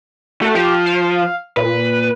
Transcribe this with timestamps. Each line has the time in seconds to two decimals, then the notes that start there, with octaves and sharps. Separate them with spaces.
0.41 A3 F#4 A4
0.55 F3 G4
0.86 F5
1.57 A#2 B4